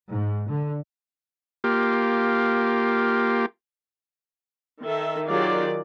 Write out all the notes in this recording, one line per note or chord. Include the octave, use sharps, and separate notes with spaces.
G#2
D3
A#3 F4 G4
D#3 A4 E5
D#3 F#3 F4 G4 G#4 D5